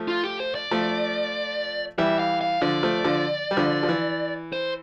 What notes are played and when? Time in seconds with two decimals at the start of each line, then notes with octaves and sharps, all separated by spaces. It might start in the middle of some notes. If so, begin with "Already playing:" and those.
Already playing: F3 A3
0.08 F4
0.24 G4
0.40 C5
0.55 D5
0.71 F3 A3
1.98 E3 G3 E5
2.19 F5
2.41 F5
2.62 D3 F3 D5
2.83 F3 A3
3.04 D3 F3
3.51 G3
3.57 D3 F3
3.83 F3
3.89 E3
4.53 C5